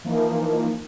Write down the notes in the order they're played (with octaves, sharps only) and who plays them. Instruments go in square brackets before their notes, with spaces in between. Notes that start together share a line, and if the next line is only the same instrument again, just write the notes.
[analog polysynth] E3 F3 A#3 D#4